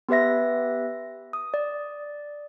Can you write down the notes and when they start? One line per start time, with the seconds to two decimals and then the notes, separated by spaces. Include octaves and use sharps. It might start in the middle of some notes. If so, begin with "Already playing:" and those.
0.09 B3 G4 B4 E5 A#6
1.33 D#6
1.54 D5